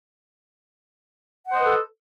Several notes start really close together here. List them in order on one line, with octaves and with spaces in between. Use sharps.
F#5 C5 D#5 B4 A4